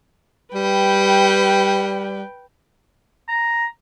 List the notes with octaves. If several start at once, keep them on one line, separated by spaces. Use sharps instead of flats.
G3 B4 G5
A#5